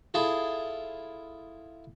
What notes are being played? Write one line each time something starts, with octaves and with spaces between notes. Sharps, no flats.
E4 F4 G#4 A4